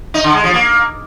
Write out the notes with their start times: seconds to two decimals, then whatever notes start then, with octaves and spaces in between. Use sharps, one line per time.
0.14 D#4
0.24 D3
0.34 G#3
0.44 F3
0.54 A#3